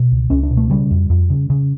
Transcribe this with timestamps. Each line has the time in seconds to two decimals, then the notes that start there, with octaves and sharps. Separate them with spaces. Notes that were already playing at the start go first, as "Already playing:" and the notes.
Already playing: B2
0.11 C#2
0.30 C#2 C#4
0.43 D4
0.50 B2
0.57 A3
0.70 C#3 G3
0.91 F2
1.10 F2
1.30 C#3
1.50 C#3